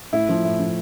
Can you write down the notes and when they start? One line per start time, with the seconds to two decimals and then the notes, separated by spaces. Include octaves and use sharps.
0.13 A2 E4
0.29 F3
0.45 A2
0.60 F3